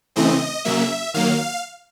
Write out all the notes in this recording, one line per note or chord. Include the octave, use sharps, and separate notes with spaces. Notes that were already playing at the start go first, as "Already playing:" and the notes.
C#3 E3 A3 C4 D#5
C#3 F#3 A#3 E5
D#3 F#3 A#3 F5